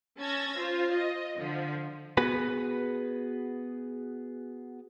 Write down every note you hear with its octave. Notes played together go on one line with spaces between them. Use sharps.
C#4 A5 E6 G#6 A#6
F4 C5
D#5
D3 F3
B3 F#4 G#4 B4